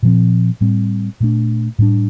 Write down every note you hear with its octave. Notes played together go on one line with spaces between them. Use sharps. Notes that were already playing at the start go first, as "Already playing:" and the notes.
A#2 F3 C4
A2 G3 C4
A#2 A3 D4
A2 G3 D4